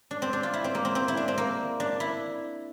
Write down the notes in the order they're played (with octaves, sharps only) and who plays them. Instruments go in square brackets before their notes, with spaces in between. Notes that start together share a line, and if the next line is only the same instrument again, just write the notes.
[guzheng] D4
C4
D4
F4
E4
C4
A#3
C4
C4
E4
D4
C4
A#3
D4
E4